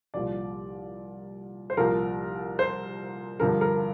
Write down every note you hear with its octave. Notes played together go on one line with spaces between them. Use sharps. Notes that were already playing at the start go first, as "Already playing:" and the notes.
C2 A#2 F3 D5
C5
C2 A#2 F3 A#4
C5
G2 D3 F3 A#4
A#4